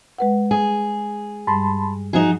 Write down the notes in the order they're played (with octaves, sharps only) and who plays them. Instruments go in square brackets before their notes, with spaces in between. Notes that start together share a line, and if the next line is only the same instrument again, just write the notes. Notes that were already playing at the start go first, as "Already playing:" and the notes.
[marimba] G#3 B4 F#5
[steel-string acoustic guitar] G#4
[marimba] G2 G3 [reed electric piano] A5 B5 C6
[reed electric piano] F3 [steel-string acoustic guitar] D#4 F#4 G#4